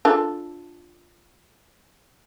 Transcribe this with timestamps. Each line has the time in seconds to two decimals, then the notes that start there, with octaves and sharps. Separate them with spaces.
0.05 D4 F4 A4